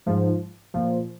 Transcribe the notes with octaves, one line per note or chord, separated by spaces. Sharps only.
G#2 F3
A#2 F3